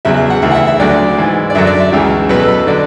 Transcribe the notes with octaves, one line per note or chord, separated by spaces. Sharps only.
E2 C#3 F#3 E5
E5
F#5
D2 C#3 E3 E5
F#5
E5
E5
D2 D3 F#3 D5
G#2 E3
D5
F#2 D3 F#3 E5
D5
E5
C#2 C#3 E3 E5
E2 B2 F#3 B4
A4
B4
D3 F#3 D5